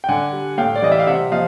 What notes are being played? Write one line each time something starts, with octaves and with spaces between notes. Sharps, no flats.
G5
D3 F#5 G#5
G3
A2 F5 G5
D5
E3 G3 D#5
E5
F5
C3 E5 F#5
F3 D#5 F5